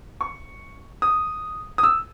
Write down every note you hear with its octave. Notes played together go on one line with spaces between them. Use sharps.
C#6
D#6
D#6
E6